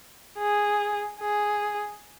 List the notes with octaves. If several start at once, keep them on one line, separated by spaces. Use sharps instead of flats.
G#4
G#4